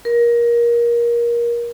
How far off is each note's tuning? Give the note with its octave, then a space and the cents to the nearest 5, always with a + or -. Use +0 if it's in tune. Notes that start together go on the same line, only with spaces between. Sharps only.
A#4 +20